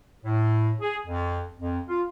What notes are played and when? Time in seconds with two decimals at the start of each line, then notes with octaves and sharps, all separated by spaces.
0.25 A2
0.81 G#4
1.06 F2
1.60 F2
1.89 F4